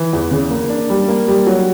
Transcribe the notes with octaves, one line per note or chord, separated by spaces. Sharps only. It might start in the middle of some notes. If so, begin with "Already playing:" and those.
Already playing: E3
E2
C#3
A#3
D4
G3
A#3
G3
F#3